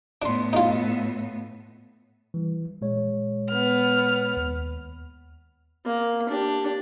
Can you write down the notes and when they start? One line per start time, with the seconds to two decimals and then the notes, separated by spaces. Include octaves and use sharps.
0.22 A2 B3 D4 C6
0.53 D#4 F4
2.34 E3 G3
2.81 A#2 G#3 C#5
3.50 B3 F6
4.37 D#2
5.86 A#3
6.29 D4 G4